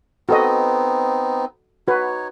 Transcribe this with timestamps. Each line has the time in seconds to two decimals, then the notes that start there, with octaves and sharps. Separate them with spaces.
0.29 B3 C4 D#4 F#4 A4 D#5
1.88 D#4 F#4 B4 C#5